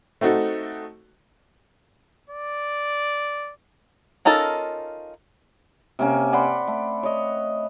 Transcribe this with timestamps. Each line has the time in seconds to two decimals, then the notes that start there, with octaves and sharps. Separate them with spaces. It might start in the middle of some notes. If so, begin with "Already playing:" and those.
0.21 A3 C4 D#4 F#4 A4
2.29 D5
4.25 C#4 D#4 F4 A4 A#4
5.99 C3 A#3 C#4
6.33 D5 F#5 B5 C6
6.67 A3
7.03 C#5 D#5